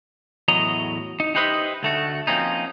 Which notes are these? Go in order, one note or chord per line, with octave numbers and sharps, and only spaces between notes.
E2 A2 F#3 D#5 A#5
D#4
D#4 G4 B4 C5 D#5 E5
D2 A3 F#4
F3 A#3 C4 C#4 D#4